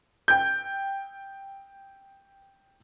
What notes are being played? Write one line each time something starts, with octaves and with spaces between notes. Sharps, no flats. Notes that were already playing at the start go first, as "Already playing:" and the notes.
G5 G6